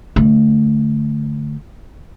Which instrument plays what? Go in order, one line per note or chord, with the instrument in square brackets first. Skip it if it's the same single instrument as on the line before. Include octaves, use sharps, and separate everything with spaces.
[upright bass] D3 A3